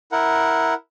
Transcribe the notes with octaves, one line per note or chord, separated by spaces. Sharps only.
E4 A#4 F#5